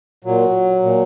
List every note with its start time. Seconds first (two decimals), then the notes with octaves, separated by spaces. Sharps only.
0.24 A#2 F#3
0.82 A#2